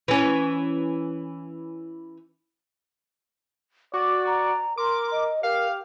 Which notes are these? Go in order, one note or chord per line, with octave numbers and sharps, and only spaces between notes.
E3 C#4
F#4 D5 D6
A#5
A#4 C6 D6
D#5
G4 A#4 F5